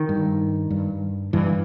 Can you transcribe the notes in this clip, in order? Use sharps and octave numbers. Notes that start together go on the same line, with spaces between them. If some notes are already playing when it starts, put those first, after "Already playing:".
Already playing: D#3
G2
G2
G2 E3